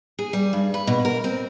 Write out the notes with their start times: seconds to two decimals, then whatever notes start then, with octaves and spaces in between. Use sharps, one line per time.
0.19 G#4
0.33 G3
0.53 G2
0.74 B4
0.87 B2
1.05 A#4
1.24 C4